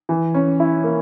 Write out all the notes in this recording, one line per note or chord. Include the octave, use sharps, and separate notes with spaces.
E3
C#4
E4
A#3